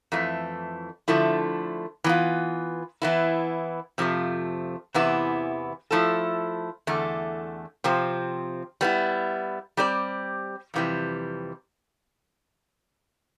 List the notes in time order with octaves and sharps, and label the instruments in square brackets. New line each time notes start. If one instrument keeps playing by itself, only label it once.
[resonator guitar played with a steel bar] F2 E3 A3
D3 F3 A3 E4
E3 B3 F4
E3 B3 E4
F2 C3 F3 A3
E2 C3 E3 B3 E4
F3 A3 E4 A4
E2 D3 A3
C3 F3 C4
G3 B3 E4
G3 C4 G4 D5
F2 C3 E3 G3